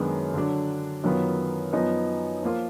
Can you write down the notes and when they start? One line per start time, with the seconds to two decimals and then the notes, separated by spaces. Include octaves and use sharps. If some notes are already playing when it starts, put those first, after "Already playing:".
Already playing: F#2 D#3 G#3 B3 D4
0.33 D3 F#3 D4
1.04 F#2 D#3 F#3 B3 F4
1.73 F#2 F3 B3 D#4
2.43 F3 A#3 F4